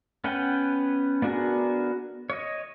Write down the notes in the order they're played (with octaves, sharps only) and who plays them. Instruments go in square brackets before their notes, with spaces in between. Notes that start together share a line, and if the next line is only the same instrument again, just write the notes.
[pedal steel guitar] B3 C#4 B4 F#5 G5
B3 D4 F#4 G#4 A#4
C#5 D#5